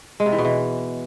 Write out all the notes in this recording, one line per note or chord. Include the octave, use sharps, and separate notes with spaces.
G#3
C3
E3
B2
E3